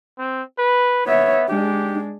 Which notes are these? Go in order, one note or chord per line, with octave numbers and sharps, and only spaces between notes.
C4
B4
B3 C#5 E5
G#3 D4 G4